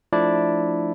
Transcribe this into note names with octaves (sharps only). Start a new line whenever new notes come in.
F3 A3 D4 E4 D5